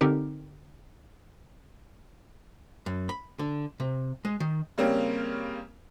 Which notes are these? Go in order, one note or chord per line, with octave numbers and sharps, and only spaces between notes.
D3 C4 D#4 G4 A#4
F#2
B5
D3
C3
G#3
D#3
C#3 G3 A#3 C4 C#4